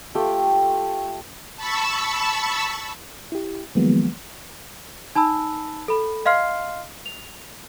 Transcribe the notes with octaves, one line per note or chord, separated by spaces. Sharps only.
A3 F4 G4 G5
A5 B5 C#6 E6
E4 G4
D#3 F3 F#3 G#3 A#3 B3
D#4 A5 B5 E6
A4 B5
D#5 F5 C6 F6 C7
F7